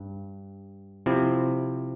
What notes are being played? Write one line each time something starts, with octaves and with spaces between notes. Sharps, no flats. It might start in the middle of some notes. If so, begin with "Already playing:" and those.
Already playing: G2
C3 F3 C4 E4